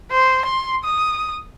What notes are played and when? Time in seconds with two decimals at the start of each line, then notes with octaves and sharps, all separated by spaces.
0.11 C5
0.45 C6
0.84 D#6